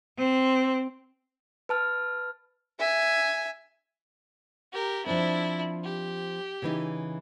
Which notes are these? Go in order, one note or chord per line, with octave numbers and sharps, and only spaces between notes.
C4
B4 A5 F6
E5 G#5
G4 A#4
F3 C4 D4 E4
G4
C#3 E3 D#4